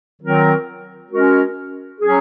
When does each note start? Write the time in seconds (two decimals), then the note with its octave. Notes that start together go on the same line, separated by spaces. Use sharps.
0.21 D#3 F#3 C4 F4 A#4
1.11 G#3 C#4 F#4 A#4
2.01 F#3 C#4 G#4